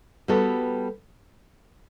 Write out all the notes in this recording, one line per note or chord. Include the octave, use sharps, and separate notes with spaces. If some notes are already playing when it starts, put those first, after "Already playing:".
G3 B3 F#4 A4